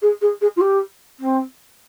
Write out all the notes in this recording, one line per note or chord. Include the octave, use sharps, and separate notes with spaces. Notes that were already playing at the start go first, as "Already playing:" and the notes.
G#4
G#4
G#4
F4
G4
C4